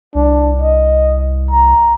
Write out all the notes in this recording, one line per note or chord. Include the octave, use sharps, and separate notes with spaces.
C2 D4
D#5
A#5